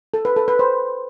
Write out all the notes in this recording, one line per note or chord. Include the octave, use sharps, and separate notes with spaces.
A4
B4
A4
B4
C5